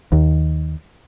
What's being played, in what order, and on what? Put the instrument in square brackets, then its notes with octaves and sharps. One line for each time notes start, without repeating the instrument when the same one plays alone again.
[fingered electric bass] D#2